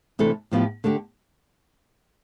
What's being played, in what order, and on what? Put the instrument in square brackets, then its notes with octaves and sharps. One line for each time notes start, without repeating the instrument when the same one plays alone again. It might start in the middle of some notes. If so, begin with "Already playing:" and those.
[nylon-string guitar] C3 E3 A3 D4 A4
A2 F3 B3 E4 G4
D3 A3 D4 G4